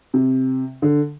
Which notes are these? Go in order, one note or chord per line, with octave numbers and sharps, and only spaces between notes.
C3
D3